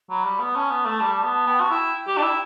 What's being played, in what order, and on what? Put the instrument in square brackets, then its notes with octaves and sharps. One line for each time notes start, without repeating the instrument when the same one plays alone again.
[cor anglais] F#3 [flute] B5
[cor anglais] G3
B3
[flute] B5
[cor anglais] C#4 [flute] A5
[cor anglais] B3
A3
G3
B3
[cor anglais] B3 [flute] G5
[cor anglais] F#4 [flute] A5
[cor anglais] E4 [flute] G5
[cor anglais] G4
D4
E4